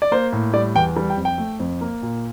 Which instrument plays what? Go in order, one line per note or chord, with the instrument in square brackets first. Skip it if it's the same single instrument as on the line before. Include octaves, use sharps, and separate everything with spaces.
[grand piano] D5
A#3 C5
A2
G3 D5
E2 G5
G3
G5
F2
G5
A3
F2
A#3
A#2